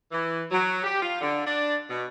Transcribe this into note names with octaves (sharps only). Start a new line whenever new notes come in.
E3
F#3
G4
F4
D3
D4
B2